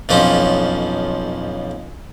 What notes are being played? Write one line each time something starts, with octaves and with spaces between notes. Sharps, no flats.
B1 F2 F3 C#4